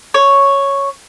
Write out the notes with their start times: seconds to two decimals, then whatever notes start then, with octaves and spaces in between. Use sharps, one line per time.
0.14 C#5